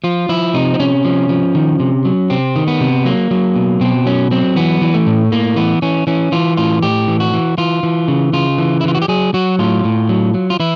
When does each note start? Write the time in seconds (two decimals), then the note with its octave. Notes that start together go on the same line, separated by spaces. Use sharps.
0.04 F3 F4
0.29 F3 E4
0.54 C3 D#4
0.74 C4
0.79 C3 C#4
1.05 F3
1.29 F3
1.55 D#3
1.80 C3
2.05 F#3
2.30 C3 C4
2.56 D#3
2.68 B3
2.80 C3
3.05 F#3 A#3
3.31 F#3
3.56 B2
3.81 B2 C4
4.06 F#3 C#4
4.31 F#3 C4
4.56 E3 B3
4.81 E3
4.94 A3
5.06 A2
5.32 A2 A#3
5.56 E3 B3
5.82 E3 C#4
6.07 E3 C#4
6.32 E3 F4
6.57 A2 F4
6.82 A2 G4
7.08 E3
7.20 F#4
7.33 E3
7.58 E3 F4
7.83 E3
8.08 C#3
8.33 C#3 F4
8.58 E3
8.81 E4
8.84 E3 F4
8.95 F#4
9.02 G4
9.08 F#3 G#4
9.34 F#3 F#4
9.59 A2 F4
9.84 A2
10.09 F#3
10.34 F#3
10.50 F4
10.60 E3 E4